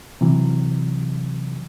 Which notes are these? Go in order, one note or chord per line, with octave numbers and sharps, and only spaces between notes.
C3 E3 F#3